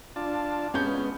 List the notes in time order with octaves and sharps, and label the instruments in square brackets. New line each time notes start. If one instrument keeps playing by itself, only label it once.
[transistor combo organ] D4 F4 A5
[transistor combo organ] G#3 B3 [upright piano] C#4 G6